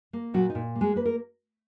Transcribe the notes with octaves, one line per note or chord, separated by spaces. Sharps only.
A#3
A#2 F#3 F#4
D#4
A#2
A#3
G#3 G#4
A#3 B4
A#4